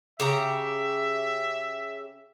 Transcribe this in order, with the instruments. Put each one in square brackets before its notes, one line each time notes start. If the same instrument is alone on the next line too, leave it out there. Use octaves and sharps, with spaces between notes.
[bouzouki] C#3 G4 A#5 [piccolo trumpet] E5